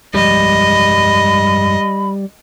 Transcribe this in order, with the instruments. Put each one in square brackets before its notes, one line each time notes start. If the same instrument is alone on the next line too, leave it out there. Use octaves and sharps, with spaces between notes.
[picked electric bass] G2 F3 G#3 [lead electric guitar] G3 [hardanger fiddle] D#5 [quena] B5